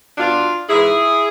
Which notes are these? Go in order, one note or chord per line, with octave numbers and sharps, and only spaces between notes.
B2 D4 F4
G#2 E3 E4 G#4